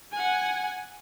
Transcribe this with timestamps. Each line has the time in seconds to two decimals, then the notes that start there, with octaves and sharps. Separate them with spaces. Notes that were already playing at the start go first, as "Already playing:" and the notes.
0.13 F#5 G#5